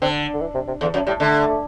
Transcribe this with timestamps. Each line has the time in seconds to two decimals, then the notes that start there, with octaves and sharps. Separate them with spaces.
0.02 D3 C4
0.34 D3
0.41 E3
0.54 C3
0.67 C3
0.81 E2 D3
0.94 F#2 F#3
1.07 A2 G3
1.20 D3 A3